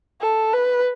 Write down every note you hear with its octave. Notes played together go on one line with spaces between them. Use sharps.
A4
B4